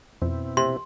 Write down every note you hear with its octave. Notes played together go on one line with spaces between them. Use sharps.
F2 B2 C4 E4
C3 C6